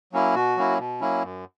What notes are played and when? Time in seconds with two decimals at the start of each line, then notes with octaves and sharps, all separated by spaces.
0.13 F#3 A#3 C#4 E4
0.35 B2 F#4
0.57 F#3 A#3 C#4 E4
0.79 B2
1.01 F#3 A#3 C#4 E4
1.23 F#2